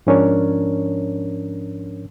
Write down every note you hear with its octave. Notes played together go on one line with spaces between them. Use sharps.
G#2 F3 C#4 D4 A#4 C#5